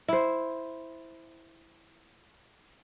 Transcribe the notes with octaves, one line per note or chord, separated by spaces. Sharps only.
E4 C5